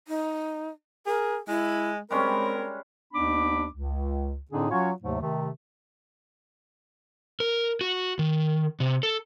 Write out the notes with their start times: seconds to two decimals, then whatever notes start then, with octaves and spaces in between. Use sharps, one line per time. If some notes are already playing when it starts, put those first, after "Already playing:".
0.08 D#4
1.07 G#4 A#4
1.48 G#3 E4
2.11 G3 G#3 C4 C#4 A#4
3.13 D#2 B3 D4 D#4 B5 D6
3.73 C#2
4.51 A2 D3 C4 D4 D#4 G#4
4.69 F#3 C#4 F4 F#4 C#5
5.01 D#2 G#2 C3 F#3 A3
5.21 C3 D#3 A3
7.40 A#4
7.81 F#4
8.19 D#3
8.80 C3
9.03 A4